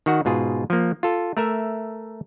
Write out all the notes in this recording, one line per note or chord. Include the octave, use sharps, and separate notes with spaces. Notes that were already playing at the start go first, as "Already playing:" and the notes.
D#3 F#4 F#5
G#2 B2 F4 G#4
F3 A#3
F4 A4
A3 A#4 E5